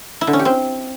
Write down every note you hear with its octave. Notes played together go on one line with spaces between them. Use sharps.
E4
D3
C#4
G4
C4